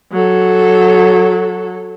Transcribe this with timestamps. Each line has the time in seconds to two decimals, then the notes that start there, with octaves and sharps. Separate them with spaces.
0.12 F#3 A4